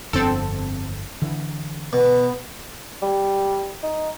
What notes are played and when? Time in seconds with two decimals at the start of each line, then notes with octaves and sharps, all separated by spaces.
0.13 G1 F2 D3 C4 A4
1.22 D3 E3
1.93 B2 B3
3.02 G3
3.83 D#4